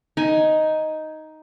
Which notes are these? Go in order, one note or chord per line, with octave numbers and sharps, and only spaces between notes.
D#4 G#5